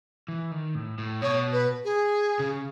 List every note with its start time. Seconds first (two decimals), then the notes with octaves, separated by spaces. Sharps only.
0.28 E3
0.51 D#3
0.75 A2
0.98 A2
1.22 B2 C#5
1.53 B4
1.84 G#4
2.40 C#3